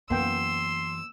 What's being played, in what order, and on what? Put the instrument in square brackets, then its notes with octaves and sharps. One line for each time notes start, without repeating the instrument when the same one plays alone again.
[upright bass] F#2 E3 [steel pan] A#3 B3 G5 [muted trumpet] C6 [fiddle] E6